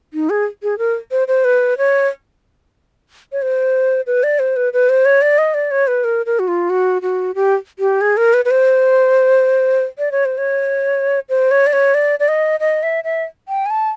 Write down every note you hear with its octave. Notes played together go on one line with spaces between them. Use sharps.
D#4
G#4
G#4
A#4
C5
C5
B4
C#5
C#5
C5
B4
D5
C5
B4
B4
C5
C#5
D5
D#5
D5
C#5
B4
A#4
A#4
F#4
F4
F#4
F#4
G4
G4
G#4
A#4
B4
B4
C5
D5
C#5
C5
C#5
C5
C#5
D5
C#5
D5
D5
D#5
D#5
E5
E5
G5
G#5
A5